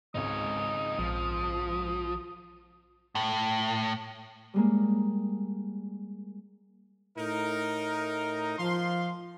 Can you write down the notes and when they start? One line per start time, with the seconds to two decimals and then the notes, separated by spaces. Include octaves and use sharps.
0.15 G#1 C#2 D#4 C#5 D#6
0.99 A#1 F3
3.15 A2
4.54 G3 G#3 A#3
7.17 A2 D#4 A#4
8.58 F3 F5 C6